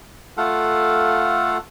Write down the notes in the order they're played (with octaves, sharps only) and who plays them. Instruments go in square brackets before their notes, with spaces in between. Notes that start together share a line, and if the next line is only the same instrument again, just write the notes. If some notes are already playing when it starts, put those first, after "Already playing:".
[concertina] A3 F4 A4 F5 F#5